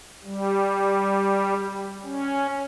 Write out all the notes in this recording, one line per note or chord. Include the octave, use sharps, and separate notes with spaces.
G3
C#4